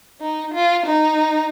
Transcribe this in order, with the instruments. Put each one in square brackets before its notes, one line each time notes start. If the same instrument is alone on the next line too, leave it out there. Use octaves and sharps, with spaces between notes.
[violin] D#4
F4
D#4